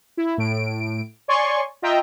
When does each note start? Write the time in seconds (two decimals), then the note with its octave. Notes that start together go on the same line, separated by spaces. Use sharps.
0.17 E4
0.38 A2 D7
1.28 C#5 D5 G#5 C6 C#6
1.82 F4 D#5 E5 G5 A#5